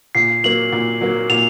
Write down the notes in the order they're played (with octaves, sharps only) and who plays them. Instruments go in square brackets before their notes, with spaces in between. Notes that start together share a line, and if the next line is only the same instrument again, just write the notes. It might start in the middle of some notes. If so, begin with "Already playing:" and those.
[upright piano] A#2 [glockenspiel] C7
[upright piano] F#3 A#3 [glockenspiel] F#7
[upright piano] A#2
F#3 A#3
[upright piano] A#2 [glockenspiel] F7